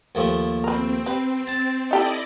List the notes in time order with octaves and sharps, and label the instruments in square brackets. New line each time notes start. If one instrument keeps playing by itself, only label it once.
[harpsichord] D#2 F3 A3
[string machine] C4 [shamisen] A#4 B4
[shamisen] G4 [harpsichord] B4
[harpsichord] A5
[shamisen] D#4 G4 A4 [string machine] E4 D5 D#5